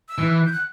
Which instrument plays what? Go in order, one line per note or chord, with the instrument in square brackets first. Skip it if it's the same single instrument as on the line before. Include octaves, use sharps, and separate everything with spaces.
[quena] E6
[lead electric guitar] E3
[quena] F#6
G6
F#6